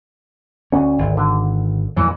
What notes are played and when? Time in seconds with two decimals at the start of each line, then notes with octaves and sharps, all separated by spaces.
0.72 D2 C#4
0.98 G#1
1.17 D3
1.97 F2 A#2 E3 F#3